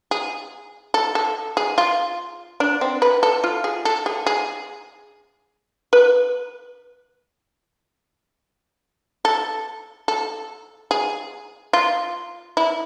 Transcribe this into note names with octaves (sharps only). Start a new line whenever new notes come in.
G#4
A4
A4
G#4
F4
D4
C4
B4
A4
F4
G#4
A4
G#4
G#4
B4
A4
A4
G#4
F4
E4